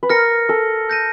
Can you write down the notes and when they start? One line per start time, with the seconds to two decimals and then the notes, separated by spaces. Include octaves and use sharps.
0.03 B4
0.10 A#4 F6 A#6 C#7
0.49 A4
0.89 G6 A#6 D#7